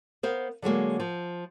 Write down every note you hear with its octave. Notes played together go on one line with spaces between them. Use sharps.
B3 A#4 C5 F5
D3 F#3 G#3 A#3
F3